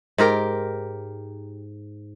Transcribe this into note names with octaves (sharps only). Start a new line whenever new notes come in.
G#2 G4 A#4 G5